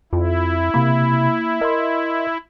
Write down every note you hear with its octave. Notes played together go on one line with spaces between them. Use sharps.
F2 E4 F4
C3 A#3 B5
A#4 D#5 C6